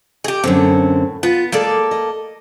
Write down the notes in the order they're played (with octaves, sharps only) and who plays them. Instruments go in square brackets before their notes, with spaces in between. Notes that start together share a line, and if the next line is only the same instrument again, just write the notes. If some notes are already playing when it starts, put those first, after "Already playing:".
[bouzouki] G4 G#4 [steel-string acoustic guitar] D#5
[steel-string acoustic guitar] F#2 D3 C4 [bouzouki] A2
[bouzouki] B3 [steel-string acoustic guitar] F4
[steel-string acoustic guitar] G#3 [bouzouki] A#3 A4 D5
[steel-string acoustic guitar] D#5